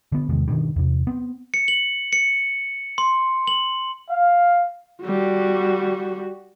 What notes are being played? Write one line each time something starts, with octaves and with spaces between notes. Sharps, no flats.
D3 B3
E2 C3 D#3 G#3
G2 B2 D3 D#3
E2 C3
B3 C4
C#7
F#7
C#7
C6
F#7
F5
G3 F#4